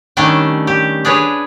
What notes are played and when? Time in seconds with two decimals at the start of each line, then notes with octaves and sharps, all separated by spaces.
0.17 D#3 G3 A3 C#4 D4
0.67 G4
1.05 D4 G#4 B4 C#5